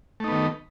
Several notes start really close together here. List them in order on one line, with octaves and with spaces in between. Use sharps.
A3 D#4 B3 D#3